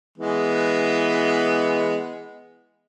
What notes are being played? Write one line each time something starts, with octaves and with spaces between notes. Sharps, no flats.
E3 G#3 B3